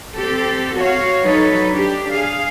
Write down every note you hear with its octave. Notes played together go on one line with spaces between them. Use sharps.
C4 G4 A4
F#4 C#5 F5
F#3 D#4 A4 B4 C#5
D4 G4
G#4 F5